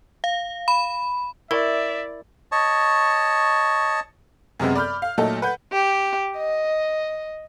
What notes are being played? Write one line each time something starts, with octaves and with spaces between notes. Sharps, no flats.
F5
B5
E4 A#4 D5 E5 C#6
C#5 D#5 A5 C#6
F#2 C3 G#3 B3 C4
D5 B5 F6 G6
F5
A#2 F#3 A3 D#4 A4
B4 F#5 G6
G4
D#5